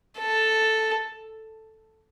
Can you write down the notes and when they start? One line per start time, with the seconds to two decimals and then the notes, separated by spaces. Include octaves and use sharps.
0.19 A4